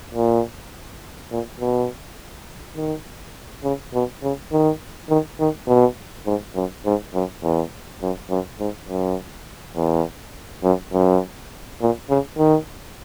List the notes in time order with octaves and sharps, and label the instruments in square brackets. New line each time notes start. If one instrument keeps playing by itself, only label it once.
[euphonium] A#2
A#2
B2
D#3
C#3
B2
C#3
D#3
D#3
D#3
B2
G#2
F#2
G#2
F#2
E2
F#2
F#2
G#2
F#2
E2
F#2
F#2
A#2
C#3
D#3